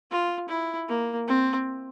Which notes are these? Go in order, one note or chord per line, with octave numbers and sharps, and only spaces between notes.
F4
E4
A#3
C4